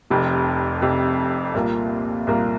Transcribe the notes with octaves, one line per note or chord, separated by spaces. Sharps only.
F1 F2 C3
F1 F2 C3
C2 A#2 A#3 F4
C2 A#2 A#3 F4